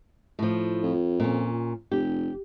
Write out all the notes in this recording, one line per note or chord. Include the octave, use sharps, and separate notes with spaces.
A2 F3
F2
A#2 C#4
F1 G4